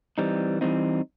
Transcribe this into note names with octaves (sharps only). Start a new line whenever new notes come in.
E3 G3 C4 D#4
E3 G3 C4 D#4